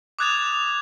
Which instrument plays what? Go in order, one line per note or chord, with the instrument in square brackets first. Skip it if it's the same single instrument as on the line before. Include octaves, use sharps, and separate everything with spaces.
[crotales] D6 D#6 F#6 G#6 A6 F7